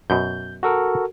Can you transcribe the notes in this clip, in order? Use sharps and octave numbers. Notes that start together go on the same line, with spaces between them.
F#2 B2 G6
F#4 A4 A#4